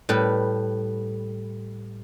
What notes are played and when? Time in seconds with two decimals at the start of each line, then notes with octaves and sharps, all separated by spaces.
0.09 A2 G3 B4